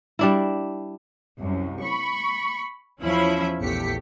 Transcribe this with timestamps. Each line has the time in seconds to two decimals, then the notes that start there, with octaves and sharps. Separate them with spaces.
0.19 G3 D4 E4
1.39 C2 F#2
1.82 B5 C#6
3.01 E2 F3 C#4 E4 E5 B5
3.60 A#1 E2 A3 G4 B6 C#7